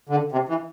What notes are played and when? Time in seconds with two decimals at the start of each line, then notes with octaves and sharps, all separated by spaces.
0.09 D3
0.32 C3
0.49 E3